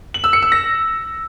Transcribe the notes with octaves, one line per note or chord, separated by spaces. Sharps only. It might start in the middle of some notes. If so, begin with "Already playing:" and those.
F#7
E6
C#7
E6
A#6